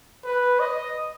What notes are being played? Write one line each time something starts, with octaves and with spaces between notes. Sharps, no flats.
B4
D#5